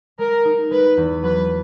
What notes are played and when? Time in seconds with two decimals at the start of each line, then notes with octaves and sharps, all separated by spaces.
0.18 G#3 A#4
0.45 D#4
0.71 G#3 B4
0.97 E2
1.23 F#3 B4